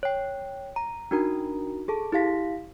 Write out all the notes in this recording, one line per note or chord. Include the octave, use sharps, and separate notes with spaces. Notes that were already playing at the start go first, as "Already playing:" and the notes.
C#5 G5
A#5
D4 D#4 F#4 A#4 A#5
G#4 A4 A5
E4 G4 F5 B6